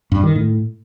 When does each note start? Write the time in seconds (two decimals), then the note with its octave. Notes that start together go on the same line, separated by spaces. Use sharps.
0.12 G2
0.24 D#3
0.36 A2